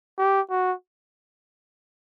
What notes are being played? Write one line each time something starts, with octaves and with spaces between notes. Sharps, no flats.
G4
F#4